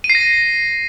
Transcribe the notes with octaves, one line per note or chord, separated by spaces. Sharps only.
D#7
C7
A#6